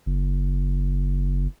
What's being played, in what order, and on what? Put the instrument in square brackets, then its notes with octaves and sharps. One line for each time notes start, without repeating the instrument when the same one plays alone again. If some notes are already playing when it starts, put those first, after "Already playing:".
[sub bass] F#1